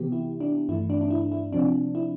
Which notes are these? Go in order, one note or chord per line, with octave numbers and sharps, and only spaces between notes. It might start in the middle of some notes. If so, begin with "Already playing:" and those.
Already playing: C3 E3 B3 G4
E4
D4
G2 E3 A3 E4
D4
D4
E4
E4
C3 F3 C4 D4
E4